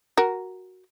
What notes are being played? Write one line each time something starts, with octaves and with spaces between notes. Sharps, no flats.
F#4 A#4